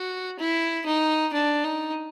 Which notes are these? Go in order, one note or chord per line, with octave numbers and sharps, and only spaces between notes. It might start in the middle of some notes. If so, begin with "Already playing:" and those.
Already playing: F#4
E4
D#4
D4
D#4